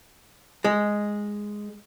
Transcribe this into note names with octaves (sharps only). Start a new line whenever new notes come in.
G#3